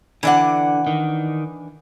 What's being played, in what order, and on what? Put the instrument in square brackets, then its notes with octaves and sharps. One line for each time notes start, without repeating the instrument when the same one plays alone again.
[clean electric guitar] D3 [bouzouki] E3 D4 F#5
[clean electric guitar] D#3